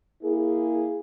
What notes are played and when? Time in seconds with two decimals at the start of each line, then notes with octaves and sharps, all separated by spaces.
0.22 A#3 E4 G#4